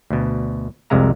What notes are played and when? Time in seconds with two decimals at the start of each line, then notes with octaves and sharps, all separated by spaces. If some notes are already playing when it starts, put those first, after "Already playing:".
0.10 D2 B2
0.90 C2 F2 C3 G#3 F5 A#5